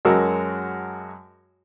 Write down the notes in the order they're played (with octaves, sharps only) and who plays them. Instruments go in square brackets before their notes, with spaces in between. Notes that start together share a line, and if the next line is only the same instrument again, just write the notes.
[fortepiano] F#2 G#3 F#4 A#4 A5 E6